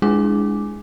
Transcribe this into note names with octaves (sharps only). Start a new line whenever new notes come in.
G#3 D4 E4 G#4 G#5 D6